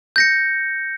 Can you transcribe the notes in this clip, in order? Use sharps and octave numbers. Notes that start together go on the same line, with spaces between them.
G6 A#6 C#7